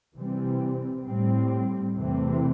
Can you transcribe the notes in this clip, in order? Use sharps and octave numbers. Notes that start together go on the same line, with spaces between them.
C3 E3 G3 C4
A2 G3 C4
E2 C3 E3 A3 C4